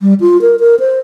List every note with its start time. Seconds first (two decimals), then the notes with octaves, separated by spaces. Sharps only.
0.01 G3
0.20 F4
0.41 A#4
0.60 A#4
0.80 C5